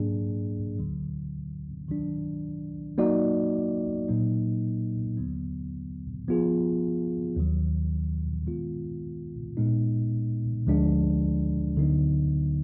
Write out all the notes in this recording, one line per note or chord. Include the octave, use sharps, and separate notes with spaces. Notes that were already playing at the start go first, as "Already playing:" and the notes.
Already playing: G#2 F#3 A#3 D4 G#4
D2 D3 F#3
D#3 F#3 D4
F#3 A#3 D#4 F#4 D5
A#2 F#3 A#3 D#4
D#2 D3 F#3 B3
F3 B3 F4 G#4
D#2 D#3 F#3
D#3 G#3 B3 F4
A#2 G#3 B3 D#4
D2 D3 F3 G#3 D4
D2 D3 F#3 B3 D#4